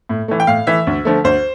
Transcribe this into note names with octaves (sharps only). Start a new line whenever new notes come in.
A2
E3 A3
G5
A2 F5
E3 A3 E5
D2
D3 F3 A3
D2 C5